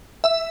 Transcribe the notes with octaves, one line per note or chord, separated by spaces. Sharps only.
E5